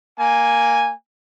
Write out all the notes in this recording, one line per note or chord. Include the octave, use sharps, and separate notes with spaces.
A#3 G#5